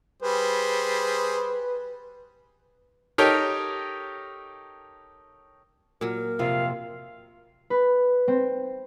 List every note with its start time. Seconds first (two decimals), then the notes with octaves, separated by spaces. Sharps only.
0.22 G3 G#4 B4 C5
3.18 D#4 G4 A4 A#4 C#5 G5
6.01 A#2 F#3 A#4
6.39 F2 C3 F4 F5
7.70 B4
8.28 C4